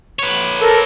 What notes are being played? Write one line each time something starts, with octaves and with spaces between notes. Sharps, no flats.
B4 C#5
A4 A#4